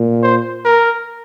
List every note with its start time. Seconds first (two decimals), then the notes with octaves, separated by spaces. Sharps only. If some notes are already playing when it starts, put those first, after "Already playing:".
Already playing: A#2
0.23 C5
0.65 A#4